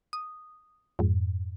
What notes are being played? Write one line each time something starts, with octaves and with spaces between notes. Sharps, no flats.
D#6
F2 G#2